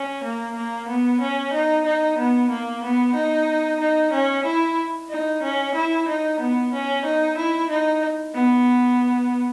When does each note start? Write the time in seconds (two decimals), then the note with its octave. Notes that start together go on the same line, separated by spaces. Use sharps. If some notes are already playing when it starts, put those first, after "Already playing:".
Already playing: C#4
0.24 A#3
0.56 A#3
0.89 B3
1.21 C#4
1.53 D#4
1.86 D#4
2.19 B3
2.50 A#3
2.84 B3
3.15 D#4
3.80 D#4
4.13 C#4
4.46 E4
5.10 D#4
5.43 C#4
5.75 E4
6.08 D#4
6.40 B3
6.73 C#4
7.06 D#4
7.37 E4
7.70 D#4
8.34 B3